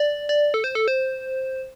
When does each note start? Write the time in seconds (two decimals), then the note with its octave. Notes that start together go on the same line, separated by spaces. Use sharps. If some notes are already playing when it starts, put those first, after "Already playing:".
Already playing: D5
0.29 D5
0.54 A4
0.64 C5
0.75 A4
0.88 C5